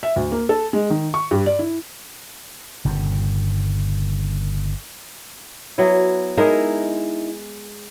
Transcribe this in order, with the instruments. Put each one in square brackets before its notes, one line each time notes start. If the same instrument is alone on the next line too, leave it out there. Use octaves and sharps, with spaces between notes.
[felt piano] E5
D2
A#3
A4
G#3
D#3
C#6
G2
D5
E4
[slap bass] G1 G2 A#2 C#3
[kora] F#3 B3 E4
[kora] G#3 D#5 [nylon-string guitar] D#4 E4 A#4